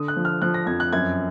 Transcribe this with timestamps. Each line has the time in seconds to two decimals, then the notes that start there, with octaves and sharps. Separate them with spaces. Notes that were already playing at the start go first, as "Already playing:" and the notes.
Already playing: D3 D#6
0.08 F#6
0.16 F3
0.25 F6
0.42 F3 F#6
0.54 A#6
0.67 F2 G#6
0.80 F#6
0.93 F#2 G#6